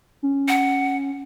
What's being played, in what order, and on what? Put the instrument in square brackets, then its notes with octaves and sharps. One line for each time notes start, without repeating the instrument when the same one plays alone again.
[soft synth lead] C#4
[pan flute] F#5